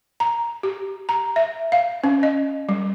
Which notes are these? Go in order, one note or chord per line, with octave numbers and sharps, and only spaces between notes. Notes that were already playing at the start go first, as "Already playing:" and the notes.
A#5
G4
A#5
E5
F5
C#4
D#5
G3